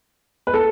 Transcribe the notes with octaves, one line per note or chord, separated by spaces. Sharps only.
B4
A4